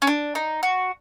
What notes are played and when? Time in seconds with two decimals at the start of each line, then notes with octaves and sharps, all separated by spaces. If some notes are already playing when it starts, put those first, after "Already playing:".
0.02 C#4
0.07 D4
0.35 D#4
0.63 F#4